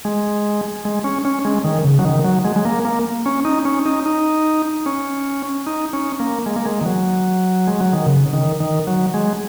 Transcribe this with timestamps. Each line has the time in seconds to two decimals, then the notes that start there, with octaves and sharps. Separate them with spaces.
0.05 G#3
0.85 G#3
1.04 C#4
1.25 C#4
1.45 G#3
1.64 D#3
1.84 C#3
1.99 F#3
2.05 D#3
2.25 F#3
2.45 G#3
2.56 G#3
2.65 A#3
2.85 A#3
3.26 C#4
3.45 D#4
3.65 C#4
3.86 D#4
4.06 D#4
4.86 C#4
5.67 D#4
5.93 C#4
6.20 A#3
6.46 G#3
6.56 A#3
6.65 G#3
6.81 D#3
6.86 F#3
7.67 G#3
7.81 F#3
7.93 D#3
8.07 C#3
8.33 D#3
8.60 D#3
8.87 F#3
9.14 G#3